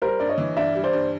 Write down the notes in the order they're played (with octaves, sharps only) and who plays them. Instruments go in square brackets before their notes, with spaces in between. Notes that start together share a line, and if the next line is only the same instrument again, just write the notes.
[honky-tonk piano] G3 [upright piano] A#4 C5
[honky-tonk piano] G2 [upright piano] D5
[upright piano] C#5 D#5
[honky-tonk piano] E3
[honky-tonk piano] G2 [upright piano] D5 E5
[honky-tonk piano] G3
[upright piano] C5 D5
[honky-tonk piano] G2